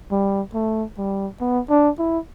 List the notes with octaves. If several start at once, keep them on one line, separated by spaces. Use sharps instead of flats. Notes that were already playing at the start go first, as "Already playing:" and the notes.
G3
A3
G3
B3
D4
E4